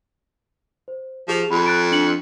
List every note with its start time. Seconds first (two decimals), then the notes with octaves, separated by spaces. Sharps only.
0.88 C5
1.28 F3 G4 G#4 F7
1.51 F2 B5
1.66 F#6 A6 D7
1.92 D4 C#7 F#7